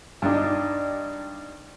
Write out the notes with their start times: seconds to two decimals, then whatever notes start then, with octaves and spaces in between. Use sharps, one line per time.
0.22 G2 D4 D#4